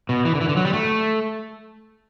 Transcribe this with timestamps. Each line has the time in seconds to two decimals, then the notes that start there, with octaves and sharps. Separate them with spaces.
0.09 B2
0.25 E3
0.35 D3
0.41 E3
0.49 D3
0.57 F#3
0.65 G3
0.73 A3